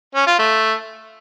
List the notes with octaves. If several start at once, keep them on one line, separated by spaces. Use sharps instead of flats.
C#4
F4
A3